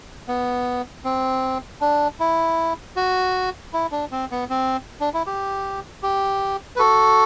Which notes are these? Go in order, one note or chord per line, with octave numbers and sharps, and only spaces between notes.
B3
C4
D4
E4
F#4
E4
D4
C4
B3
C4
D4
E4
G4
G4
B4
F#4 A4